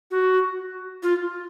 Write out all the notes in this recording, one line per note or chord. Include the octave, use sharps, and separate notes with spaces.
F#4
F4